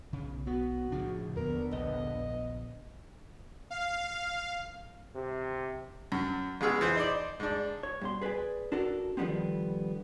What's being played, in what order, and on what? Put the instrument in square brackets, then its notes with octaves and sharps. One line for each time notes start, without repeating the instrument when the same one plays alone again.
[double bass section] B1 [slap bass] C#3
[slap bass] B3 [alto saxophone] F#4
[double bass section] A2 [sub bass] C#3 [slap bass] F3 D4
[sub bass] D#2 [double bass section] D3 B3 [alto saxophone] A#4
[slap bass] A#1 [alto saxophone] D#5
[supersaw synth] F5
[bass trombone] C3
[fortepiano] F#2
A1 G#3 B3 G#4 E6 F6
E3 G#4 C5
D#4 C5 D5
G#2 D4
[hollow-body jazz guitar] C#5
G2 B2 C6
G#4 B4 C5 D5 G#5
D4 F#4 A4 A#4
D3 D#3 F3 G3 B3 C4